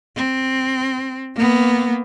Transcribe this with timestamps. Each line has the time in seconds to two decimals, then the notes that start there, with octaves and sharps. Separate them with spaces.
0.16 C4
1.36 A#3 B3